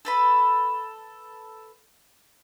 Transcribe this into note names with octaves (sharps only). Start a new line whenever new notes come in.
A4 B4 B5